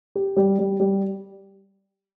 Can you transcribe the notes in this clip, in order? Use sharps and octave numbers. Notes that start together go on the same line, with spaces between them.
G4
G3
G3
G3